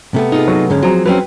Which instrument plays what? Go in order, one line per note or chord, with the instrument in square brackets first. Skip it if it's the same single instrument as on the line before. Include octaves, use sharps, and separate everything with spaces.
[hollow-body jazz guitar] C3 A3 B3
[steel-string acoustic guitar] D#4 F4 G#4
[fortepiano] F#3
[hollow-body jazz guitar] G#2 D3 C#4 [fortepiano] G#3
[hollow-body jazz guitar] F3 [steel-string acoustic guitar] F#3 [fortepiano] C4 G#4 A#5
[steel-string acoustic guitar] F#3 C4 C#4 [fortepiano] B4 G5